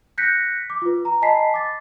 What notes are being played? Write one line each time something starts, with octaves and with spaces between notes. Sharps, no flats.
F#6 G6 A#6 B6 C#7
D6
F4 B4
A#5
D#5 G#5 A5 B5 B6 C7
D6 A6